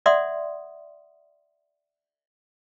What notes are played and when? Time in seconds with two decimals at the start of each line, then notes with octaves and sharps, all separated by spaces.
0.06 D5 E5 F#5 C6 D#6